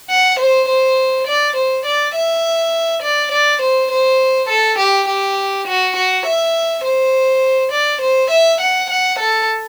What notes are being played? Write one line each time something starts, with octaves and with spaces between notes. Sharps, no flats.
F#5
C5
C5
D5
C5
D5
E5
D5
D5
C5
C5
A4
G4
G4
F#4
F#4
E5
C5
D5
C5
E5
F#5
F#5
A4